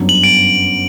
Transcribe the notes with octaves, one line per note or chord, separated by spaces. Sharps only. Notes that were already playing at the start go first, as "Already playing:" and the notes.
Already playing: G1 F#2 F#3 B3 D4
F#7
D7